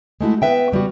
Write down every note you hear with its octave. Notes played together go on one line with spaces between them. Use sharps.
G#3 A3 E4 F#4
B3 B4 E5 G5
C#3 G3 B3 F#4